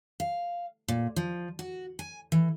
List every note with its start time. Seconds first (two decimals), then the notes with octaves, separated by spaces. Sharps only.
0.20 F5
0.88 A#2
1.16 F3
1.59 F#4
1.99 G#5
2.32 E3